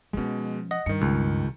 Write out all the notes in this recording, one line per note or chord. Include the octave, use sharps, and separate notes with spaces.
B2 F3 G#3 C#4
D#5 F#5
G2 D#3 C#7
C#2